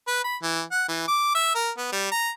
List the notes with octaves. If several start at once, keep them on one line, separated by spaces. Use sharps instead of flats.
B4
B5
E3
F#5
E3
D6
E5
A#4
B3
G3
A#5